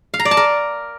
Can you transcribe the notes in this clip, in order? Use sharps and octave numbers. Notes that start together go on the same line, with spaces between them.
F5
A#5
D5
A5
A#4